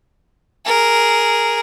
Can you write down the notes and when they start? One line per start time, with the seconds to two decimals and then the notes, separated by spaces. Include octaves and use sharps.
0.66 G#4 A#4